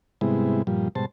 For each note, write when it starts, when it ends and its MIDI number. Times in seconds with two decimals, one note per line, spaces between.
0.21 0.62 44
0.21 0.62 48
0.21 0.62 55
0.21 0.62 56
0.21 0.62 59
0.21 0.62 64
0.67 0.88 43
0.67 0.88 46
0.67 0.88 53
0.67 0.88 55
0.95 1.05 44
0.95 1.05 47
0.95 1.05 55
0.95 1.05 72
0.95 1.05 81